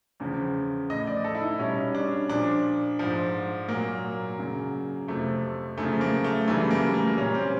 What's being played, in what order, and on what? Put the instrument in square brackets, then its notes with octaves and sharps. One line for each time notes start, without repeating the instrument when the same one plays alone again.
[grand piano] E2 C#3 F3
A2 F3 D#5
D5
A4
E4
D#4
B2 G3 C#4
D4
A#2 F3 D4
G#2 F3
A#2 F#3 A#3
F#2 C#3 F#3
F2 C3 F3 A3
F#2 C#3 F3 A3
A#3
A3
F#2 C#3 E3 G3 A3
A#3
A#3
A#2 G3 C#4
C4